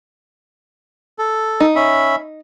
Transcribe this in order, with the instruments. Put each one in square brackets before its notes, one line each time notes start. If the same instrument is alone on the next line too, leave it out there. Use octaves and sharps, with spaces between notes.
[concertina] A4
[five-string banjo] D#4
[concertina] C#4 E5 B5